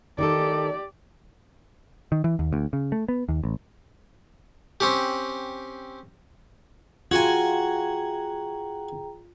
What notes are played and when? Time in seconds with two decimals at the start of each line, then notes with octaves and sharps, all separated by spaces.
0.18 D#3 D#4 G4 A4 D5
2.12 D#3
2.24 E3
2.39 D#2
2.53 D2
2.73 C#3
2.92 A3
3.08 B3
3.28 D#2
3.44 A1
4.80 C4 C#4 G4
7.11 F4 F#4 G#4 G5 G#5 A#5